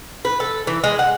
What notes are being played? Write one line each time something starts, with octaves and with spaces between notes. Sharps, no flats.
B4
A4
E3
G#3
F#5